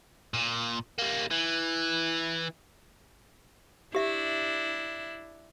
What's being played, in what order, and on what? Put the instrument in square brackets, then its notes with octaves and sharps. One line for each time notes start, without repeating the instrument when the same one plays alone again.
[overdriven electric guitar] A#2
G3 A#3
E3
[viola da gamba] D4 E4 [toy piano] G4 E5